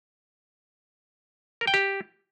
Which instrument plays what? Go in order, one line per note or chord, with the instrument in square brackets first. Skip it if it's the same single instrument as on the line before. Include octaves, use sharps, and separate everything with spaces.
[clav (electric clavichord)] A#4
G5
G4